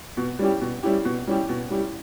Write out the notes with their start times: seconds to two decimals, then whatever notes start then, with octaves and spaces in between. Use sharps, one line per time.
0.17 B2
0.39 G3 C#4 E4 G4
0.61 B2
0.83 G3 C#4 E4 G4
1.05 B2
1.27 G3 C#4 E4 G4
1.49 B2
1.70 G3 C#4 E4 G4